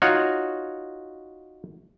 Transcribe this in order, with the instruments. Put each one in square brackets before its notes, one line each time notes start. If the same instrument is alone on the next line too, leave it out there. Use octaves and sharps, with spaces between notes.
[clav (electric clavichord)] D#4 F4 F#4 C#5